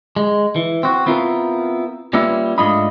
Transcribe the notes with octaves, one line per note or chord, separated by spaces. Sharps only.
G#3
E3
C4 F#4
B3 C4 E4 F4 A4 A#4
G3 A#3 C#4 F4 B4 E5
G#2 A3 D4 F4 D#5 B5